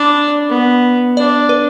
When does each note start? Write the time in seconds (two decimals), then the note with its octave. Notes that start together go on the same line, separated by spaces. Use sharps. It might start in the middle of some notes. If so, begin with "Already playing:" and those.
Already playing: D4 B5
0.49 B3
1.17 D4 D5
1.49 B4